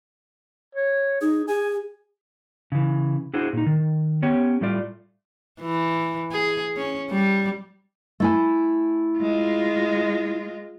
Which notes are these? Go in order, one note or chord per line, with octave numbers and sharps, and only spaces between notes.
C#5
D#4 G#4
G#4 G#5
C#3 E3
D4 E4 F#4 G#4 C5
A#2 D#4
D#3
B3 C#4 G4 C#5
A2 G3 A3 F4 D5
E3
G#4
C#4
G3
A3 E4 G#5
G#3 F4